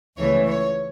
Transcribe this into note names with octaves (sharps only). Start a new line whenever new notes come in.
C#2 C#3 E3 A3 C#5
C#5